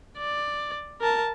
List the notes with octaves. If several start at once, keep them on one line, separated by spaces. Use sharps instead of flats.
D5
A#4 A5